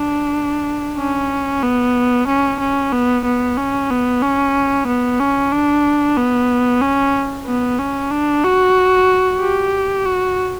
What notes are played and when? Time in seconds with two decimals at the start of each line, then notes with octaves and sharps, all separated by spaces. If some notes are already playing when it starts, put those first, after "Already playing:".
Already playing: D4
0.98 C#4
1.63 B3
2.27 C#4
2.60 C#4
2.92 B3
3.25 B3
3.57 C#4
3.90 B3
4.22 C#4
4.87 B3
5.20 C#4
5.52 D4
6.17 B3
6.81 C#4
7.46 B3
7.79 C#4
8.11 D4
8.44 F#4
9.41 G4
10.05 F#4